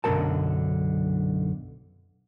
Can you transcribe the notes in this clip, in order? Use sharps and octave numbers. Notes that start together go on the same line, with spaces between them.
B1 F#2 D3 F#3 A#4 A5